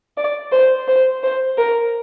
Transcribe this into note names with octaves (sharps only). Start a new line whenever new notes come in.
D5
C5
C5
C5
A#4